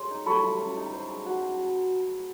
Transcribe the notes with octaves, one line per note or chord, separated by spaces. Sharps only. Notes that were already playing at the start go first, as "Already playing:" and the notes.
Already playing: G#4 C#5 C6
D#4
A4 B5 C#6
E4
C#4
D#4
C5
G#4
F#4